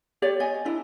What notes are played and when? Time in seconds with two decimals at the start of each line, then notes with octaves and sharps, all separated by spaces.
0.22 G4 C#5 D5
0.40 D#5 G#5
0.65 D4 E4